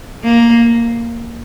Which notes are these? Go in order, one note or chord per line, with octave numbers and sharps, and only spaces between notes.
A#3